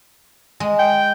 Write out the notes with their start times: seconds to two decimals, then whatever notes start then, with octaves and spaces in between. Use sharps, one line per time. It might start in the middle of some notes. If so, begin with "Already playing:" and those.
0.60 G#3
0.79 G5